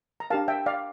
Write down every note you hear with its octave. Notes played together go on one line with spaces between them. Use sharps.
A#5
D4 G4 A#4 F5 A5
E5 G5
D5 F5